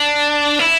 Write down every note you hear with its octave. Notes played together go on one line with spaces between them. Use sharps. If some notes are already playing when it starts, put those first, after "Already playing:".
Already playing: D4
E4